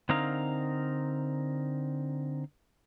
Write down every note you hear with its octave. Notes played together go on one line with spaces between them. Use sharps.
D3 C4 D#4 A#4 F5